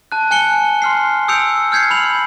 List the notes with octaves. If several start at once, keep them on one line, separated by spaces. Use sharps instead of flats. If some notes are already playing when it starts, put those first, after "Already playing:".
A5 F#6
G#5 F#6 C#7 G7
C6 F6 C7
D#6 E6 G6 C#7 D7 F7
F6 G6 G#6 C7 C#7
B5 F7 F#7